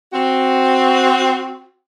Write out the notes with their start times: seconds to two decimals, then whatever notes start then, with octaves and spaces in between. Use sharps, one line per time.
0.13 C4 F#4